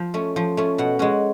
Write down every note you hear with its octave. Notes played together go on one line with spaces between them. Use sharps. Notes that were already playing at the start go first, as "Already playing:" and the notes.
Already playing: F3
A3 C#4
F3
A3 C#4
B2 F#5
G#3 C#4 F#5